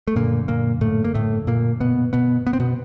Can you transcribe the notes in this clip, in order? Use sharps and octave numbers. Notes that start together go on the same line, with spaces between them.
A3
F#2 A#2 D3 A#3
A#2 A#3
A2 A3
A#3
A2 A3
A#2 A#3
B2 B3
B2 B3
B3
C4
B2 B3